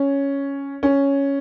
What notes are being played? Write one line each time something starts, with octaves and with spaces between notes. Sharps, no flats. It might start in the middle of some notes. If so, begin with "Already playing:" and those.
Already playing: C#4
C#4